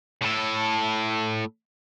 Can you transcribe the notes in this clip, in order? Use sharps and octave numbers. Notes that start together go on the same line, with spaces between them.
A2 A4